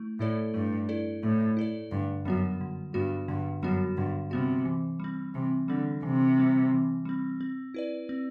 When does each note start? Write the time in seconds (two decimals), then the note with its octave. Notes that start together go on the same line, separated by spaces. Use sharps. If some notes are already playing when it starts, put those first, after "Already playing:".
Already playing: A3 E4
0.20 A2 E4 A4 D5
0.54 G2 A3
0.89 E4 A4 D5
1.23 A2 A3
1.57 E4 A4 D5
1.91 G2 D3
2.25 F#2 G3 B3 F#4
2.61 D3
2.94 G2 G3 B3 F#4
3.28 G2 D3
3.63 F#2 G3 B3 F#4
3.97 G2 D3
4.31 C3 G3 B3 F#4
4.65 E3
5.00 G3 C4
5.35 C3 E3
5.68 D3 G3 C4
6.03 C3 E3
6.38 G3 C4
6.71 E3
7.05 G3 C4
7.41 C4
7.74 E4 B4 D5
8.09 C4